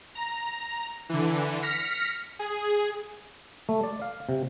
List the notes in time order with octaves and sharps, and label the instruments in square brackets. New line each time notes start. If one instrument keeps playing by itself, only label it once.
[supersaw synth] A#5
D3 E3
F6 A#6 B6 C#7
G#4
[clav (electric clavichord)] A3
D5
F5
C3